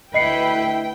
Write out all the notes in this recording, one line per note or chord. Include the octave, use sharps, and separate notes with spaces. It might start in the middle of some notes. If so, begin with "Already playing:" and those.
D2 E4 B4 D#5 G5 C7 C#7